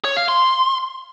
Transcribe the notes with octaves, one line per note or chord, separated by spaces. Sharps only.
C#5
F5
C6